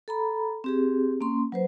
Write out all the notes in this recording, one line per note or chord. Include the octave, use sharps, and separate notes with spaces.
A4 A#5 B5
C4 G4 G#4
A#3 C#4 C6
F#3 B4 C5